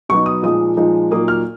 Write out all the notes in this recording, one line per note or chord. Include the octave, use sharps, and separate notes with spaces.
B2 F#3 B3 D#4 C#6
D#6
A#2 F3 G#3 D#4 D#6
A#2 F3 G#3 D#4
A#2 F#3 A#3 D#4 D#6
F6